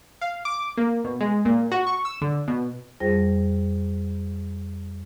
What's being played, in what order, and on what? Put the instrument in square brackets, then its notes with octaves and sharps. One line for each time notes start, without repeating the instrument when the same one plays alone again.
[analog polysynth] F5
D6
A#3
B2
G#3
A#2
F#4
C#6
E6
D3
B2
[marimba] F2 G3 F4 G#4 C5 A#6